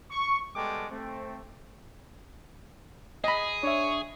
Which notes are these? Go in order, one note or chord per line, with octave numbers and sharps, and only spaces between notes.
C#6
G3 G#3 B3 A4 G5 D6
A3 C4
G#4 D#5 B5
D4 C#5 E5